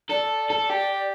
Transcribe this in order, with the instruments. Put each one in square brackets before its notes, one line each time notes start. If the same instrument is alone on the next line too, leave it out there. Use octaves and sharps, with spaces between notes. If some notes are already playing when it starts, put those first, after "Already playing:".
[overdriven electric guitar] A4 [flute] D5
[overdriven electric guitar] A4
G4